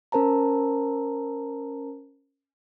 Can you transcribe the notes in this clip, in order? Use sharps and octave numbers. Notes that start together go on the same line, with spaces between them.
C#4 A#4 C5 A5 A#5